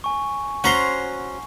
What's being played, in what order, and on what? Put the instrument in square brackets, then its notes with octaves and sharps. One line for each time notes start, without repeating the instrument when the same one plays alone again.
[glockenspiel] G#5 C#6
[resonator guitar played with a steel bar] C#4 F#4 C5 [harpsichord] F#5 A#5 C6